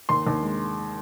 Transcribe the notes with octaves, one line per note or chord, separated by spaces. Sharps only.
D#2 C6
D#2
G#3